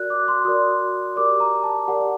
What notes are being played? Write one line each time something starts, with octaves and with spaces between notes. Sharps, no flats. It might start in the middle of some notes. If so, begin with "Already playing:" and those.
Already playing: F#4 A#4 D5 F#6
D6
C6
F#4 A#4 D5 D#6
G4 A#4 D5 D6
A#5
A5
G4 A#4 D5 F#5